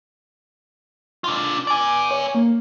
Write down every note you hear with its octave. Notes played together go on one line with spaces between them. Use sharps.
D4 F4
D5 G#5 D6
C#5
A#3